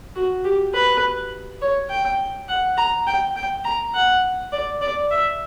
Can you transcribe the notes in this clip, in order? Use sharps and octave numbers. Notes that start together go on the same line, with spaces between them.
F#4
G4
B4
C#5
G5
F#5
A#5
G5
G5
A#5
F#5
D5
D5
E5